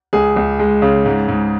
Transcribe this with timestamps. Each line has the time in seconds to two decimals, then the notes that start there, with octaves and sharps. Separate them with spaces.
0.13 C#2 G#4
0.36 C#2
0.59 G#3
0.82 C#3
1.06 G#2
1.28 G#2